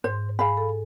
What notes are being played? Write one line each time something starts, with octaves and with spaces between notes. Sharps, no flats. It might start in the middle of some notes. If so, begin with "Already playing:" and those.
G#2 C5
G#2 G#4 F5 G#5 B5
A4